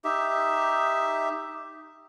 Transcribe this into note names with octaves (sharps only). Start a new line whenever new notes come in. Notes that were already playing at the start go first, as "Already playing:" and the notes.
D#4 G4 E5